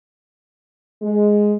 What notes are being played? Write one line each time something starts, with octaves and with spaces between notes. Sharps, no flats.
G#3